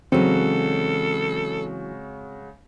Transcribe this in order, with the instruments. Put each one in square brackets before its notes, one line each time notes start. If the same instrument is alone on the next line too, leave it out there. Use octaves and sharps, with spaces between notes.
[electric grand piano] C#3 G#3 F#4 [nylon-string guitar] E3 F#3 [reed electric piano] C4 [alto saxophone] A4